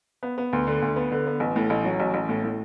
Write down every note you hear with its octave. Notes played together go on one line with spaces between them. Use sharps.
B3
B3
D2
D3
D2
B3
D3
B3
A1
A2
A1
F#3
A1
A1
A2
A2